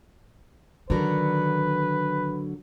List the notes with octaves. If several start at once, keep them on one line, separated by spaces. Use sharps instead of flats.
D3 D#3 F#3 A#4 B4